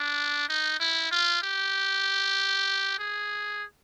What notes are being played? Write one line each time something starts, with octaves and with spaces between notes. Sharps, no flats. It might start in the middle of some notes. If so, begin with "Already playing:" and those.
Already playing: D4
D#4
E4
F4
G4
G#4